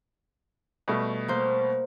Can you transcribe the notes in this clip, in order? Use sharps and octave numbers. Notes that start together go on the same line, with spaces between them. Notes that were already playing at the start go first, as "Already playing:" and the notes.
B2 G3 A3
A#3 C5